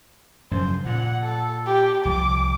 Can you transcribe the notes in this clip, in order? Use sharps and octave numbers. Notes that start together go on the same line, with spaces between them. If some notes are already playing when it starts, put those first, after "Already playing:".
F#2 C#3 F3 C5
A#2 F#5
A4
G4
C2 F3 D6